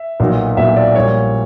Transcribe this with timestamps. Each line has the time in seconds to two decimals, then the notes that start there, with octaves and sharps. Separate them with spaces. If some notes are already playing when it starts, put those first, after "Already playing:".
Already playing: E5
0.20 B1 A#2 F#3
0.57 B1 A#2 F#3 E5
0.76 D5
0.96 A#1 A#2 G3 C#5